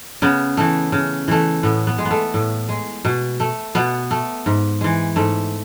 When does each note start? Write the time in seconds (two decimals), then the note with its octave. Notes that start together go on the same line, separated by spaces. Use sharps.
0.22 C#3 B3
0.57 E3 A3
0.92 C#3
1.28 E3 A3
1.63 A2 B3
1.87 B3
1.98 G#3
2.05 B3
2.11 A3
2.34 A2
2.69 G#3
3.05 B2
3.40 A3
3.75 B2 B3
4.11 A3
4.46 G#2
4.81 E3 G#3
5.16 G#2 A3